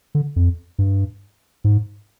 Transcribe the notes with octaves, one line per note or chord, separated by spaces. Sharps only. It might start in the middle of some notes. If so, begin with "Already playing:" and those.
D3
F2
G2
G#2